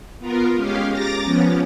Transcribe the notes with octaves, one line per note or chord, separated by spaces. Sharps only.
B3 F4 A#4
G#3 C#4 G4 F5
A#5 D6 A6 A#6
F3 B3 C#4